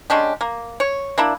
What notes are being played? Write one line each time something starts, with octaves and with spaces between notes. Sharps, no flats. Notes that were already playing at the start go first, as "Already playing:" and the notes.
G#3 C#4 D4 G4
A#3
C#5
A#3 D4 E4